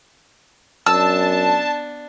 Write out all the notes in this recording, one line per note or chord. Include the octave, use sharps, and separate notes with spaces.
F#2 B3 D4 A5 E6